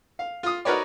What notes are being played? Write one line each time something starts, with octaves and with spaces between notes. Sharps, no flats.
F5
F4 D#6
D#4 F#4 A#4 B4 C#5 D5